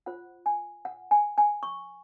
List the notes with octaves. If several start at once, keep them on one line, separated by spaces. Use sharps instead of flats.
F4 C5 F#5
G#5
F#5
G#5
G#5
C#6